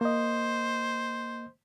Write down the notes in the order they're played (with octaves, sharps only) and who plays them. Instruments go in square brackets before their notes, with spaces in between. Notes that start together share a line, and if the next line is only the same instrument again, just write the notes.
[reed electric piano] A#3 D#5 [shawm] C5